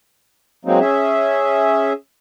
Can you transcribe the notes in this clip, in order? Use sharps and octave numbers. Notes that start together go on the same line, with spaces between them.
F#3 G#3 A#3 C4 D#4
C#4 G#4 E5